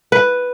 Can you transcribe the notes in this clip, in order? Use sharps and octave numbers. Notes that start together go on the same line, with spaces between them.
B4